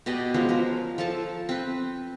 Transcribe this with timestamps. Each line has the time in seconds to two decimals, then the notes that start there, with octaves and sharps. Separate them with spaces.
0.06 B2 G4 D5 D#5
0.34 F3 G#3 B3 C#4
0.49 F3 A#4
0.98 F3 A4 A5
1.49 C4 B4